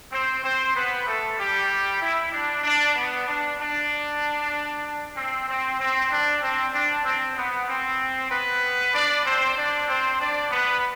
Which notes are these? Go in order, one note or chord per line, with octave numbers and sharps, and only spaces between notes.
C4 C5
C4 C5
B3 B4
A3 A4
G3 G4
E4
D4
D4
B3
D4
D4
C4
C4
C4
D4
C4
D4
C4
B3
C4
B3 B4
D4 D5
C4 C5
D4 D5
C4 C5
D4 D5
B3 B4